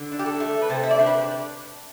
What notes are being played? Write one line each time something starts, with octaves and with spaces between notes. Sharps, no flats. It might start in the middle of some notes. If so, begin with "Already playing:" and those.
Already playing: D3
D4
G4
A4
A3
B4
C3 C5
E5
D5
D4 C5
B4